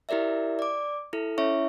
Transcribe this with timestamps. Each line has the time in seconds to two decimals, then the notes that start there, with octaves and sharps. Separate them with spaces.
0.09 E4 G4 A#4 D5 E5
0.59 D5 D6
1.13 E4 A4
1.38 C#4 E4 C#5 E5 C#6